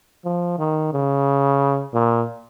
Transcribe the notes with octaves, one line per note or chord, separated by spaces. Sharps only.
F3
D#3
C#3
A#2